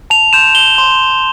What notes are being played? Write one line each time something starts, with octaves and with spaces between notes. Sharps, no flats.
A5 F7
C6 G6 E7
A5 G7
C6 G6